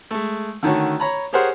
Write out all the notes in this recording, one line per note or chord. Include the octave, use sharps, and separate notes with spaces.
G#3 A3
D3 D#3 A3 C#4 F#4
C#5 A#5 B5
G4 G#4 A#4 C5 C#5 F#5